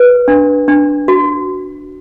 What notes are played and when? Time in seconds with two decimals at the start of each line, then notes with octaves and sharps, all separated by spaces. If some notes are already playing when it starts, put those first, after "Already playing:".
Already playing: B4
0.28 D4
0.68 D4
1.08 F#4